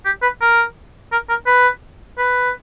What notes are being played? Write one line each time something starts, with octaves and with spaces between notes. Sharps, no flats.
G4
B4
A#4
A#4
A#4
B4
B4